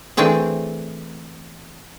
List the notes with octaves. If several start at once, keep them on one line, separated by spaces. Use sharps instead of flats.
E3 A3 C4 D4 G#4